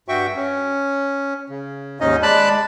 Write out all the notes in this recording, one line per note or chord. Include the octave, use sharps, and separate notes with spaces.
G2 F#4 E5 G5 C#6
C#4
C#3
D#2 G#2 C#4 D#4 D#5
G#3 D5 A5 B5 F#6